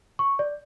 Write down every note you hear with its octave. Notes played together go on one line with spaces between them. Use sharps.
C#6
D5